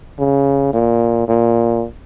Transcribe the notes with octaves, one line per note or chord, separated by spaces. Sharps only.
C#3
A#2
A#2